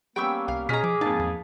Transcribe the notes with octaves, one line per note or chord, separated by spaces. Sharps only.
G3 A#3 B3 C#4 G5 C#6 E6
C2 F5
B2 C#4 G#4 D#5 A#5 F6 B6
F3 D6
F2 G#2 A#3 D#4 A5
E2